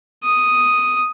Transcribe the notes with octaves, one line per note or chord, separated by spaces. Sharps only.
D#6